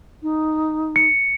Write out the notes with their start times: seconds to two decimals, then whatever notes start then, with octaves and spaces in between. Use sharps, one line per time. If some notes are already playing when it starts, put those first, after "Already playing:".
0.23 D#4
0.96 C#7